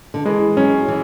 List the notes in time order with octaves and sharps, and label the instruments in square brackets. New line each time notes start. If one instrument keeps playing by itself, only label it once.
[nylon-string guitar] D3
[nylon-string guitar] E3 [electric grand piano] G#3
[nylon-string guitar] F#3 [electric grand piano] C#4
[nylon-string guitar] E3